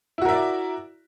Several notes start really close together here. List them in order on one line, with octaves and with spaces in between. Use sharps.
E4 F#4 A#4 E5 D5